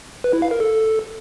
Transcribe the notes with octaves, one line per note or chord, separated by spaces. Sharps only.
B4
E4
F5
A#4
A4